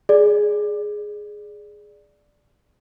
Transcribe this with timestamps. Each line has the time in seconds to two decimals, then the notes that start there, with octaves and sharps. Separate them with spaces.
0.09 G#4 D5